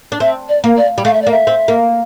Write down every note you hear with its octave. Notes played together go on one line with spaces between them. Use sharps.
D4
C4 E5
D5
A#3
D5
G3
A3 F5
E5
D5
A#3
E5
C4
A#3